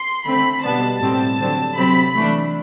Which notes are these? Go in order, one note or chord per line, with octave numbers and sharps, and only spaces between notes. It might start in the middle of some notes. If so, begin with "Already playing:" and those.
Already playing: C6
D3 A3 C4 B5
B2 G3 B3 D4 A5
A2 G3 C4
D3 F#3 C4
C3 F#3 C4 B5
E3 A3 D4